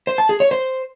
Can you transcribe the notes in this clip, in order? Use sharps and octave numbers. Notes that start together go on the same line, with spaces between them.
C5
A5
G#4
C#5
C5